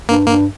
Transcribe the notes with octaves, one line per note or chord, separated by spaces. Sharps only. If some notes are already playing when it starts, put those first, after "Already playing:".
G2 A#3
G2 A#3